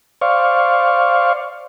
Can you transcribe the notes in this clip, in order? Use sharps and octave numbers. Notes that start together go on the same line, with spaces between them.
C5 D5 F5 C#6